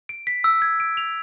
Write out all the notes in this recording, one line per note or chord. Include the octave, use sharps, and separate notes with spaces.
D7
B6
E6
G#6
D7
F7